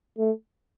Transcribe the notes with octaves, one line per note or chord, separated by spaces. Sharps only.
A3